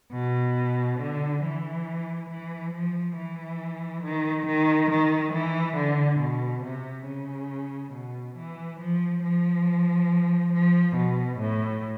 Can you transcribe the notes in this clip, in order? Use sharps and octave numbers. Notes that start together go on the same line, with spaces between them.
B2
D3
E3
E3
F3
E3
D#3
D#3
D#3
E3
D3
B2
C3
C#3
B2
E3
F3
F3
F3
B2
A2